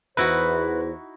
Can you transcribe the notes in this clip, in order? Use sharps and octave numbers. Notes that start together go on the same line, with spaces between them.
E2 D#4 E4 F#4 B4 C5